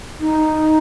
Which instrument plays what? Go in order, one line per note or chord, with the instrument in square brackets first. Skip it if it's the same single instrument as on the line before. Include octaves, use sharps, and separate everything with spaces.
[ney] D#4